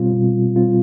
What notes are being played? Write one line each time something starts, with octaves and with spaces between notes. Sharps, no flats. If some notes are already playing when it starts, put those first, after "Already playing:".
Already playing: B2 G3 C4 F4
B2
G3 C4 F4